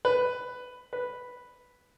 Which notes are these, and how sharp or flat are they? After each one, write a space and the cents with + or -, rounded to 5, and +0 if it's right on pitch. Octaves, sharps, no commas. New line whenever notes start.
B4 +10
B4 +0